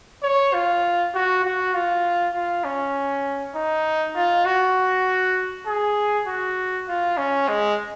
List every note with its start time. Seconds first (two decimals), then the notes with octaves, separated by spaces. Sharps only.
0.23 C#5
0.53 F4
1.14 F#4
1.44 F#4
1.74 F4
2.34 F4
2.64 C#4
3.55 D#4
4.15 F4
4.45 F#4
5.66 G#4
6.27 F#4
6.88 F4
7.17 C#4
7.48 G#3